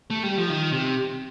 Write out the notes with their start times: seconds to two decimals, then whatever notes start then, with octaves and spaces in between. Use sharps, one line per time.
0.10 A3
0.23 G3
0.37 F3
0.50 D#3
0.72 C3